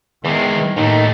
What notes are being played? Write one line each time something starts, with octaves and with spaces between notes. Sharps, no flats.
E2 D#3 E3 G#3
D#2 A2 D#3 A3 D#4